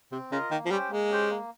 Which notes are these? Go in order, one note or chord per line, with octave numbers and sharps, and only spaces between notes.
C3 C4
C#3 F4 A#4 D#5
D#3 A#3
F3
G3 C#4 G4 C5 G5
G#3 A#3
C#4 G4 C5 G5
A#3